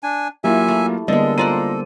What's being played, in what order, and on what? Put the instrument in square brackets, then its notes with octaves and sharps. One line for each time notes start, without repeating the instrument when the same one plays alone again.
[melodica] D4 G#5
[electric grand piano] F#3 A#3 F4 [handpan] E4 G4 [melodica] E5 G#5
[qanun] A3
[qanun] D3 G#3 [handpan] G3 A#3 B3 [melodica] A4 [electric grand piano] D#5
[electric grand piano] F4 A#5 D#7 [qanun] C5 D5 F#5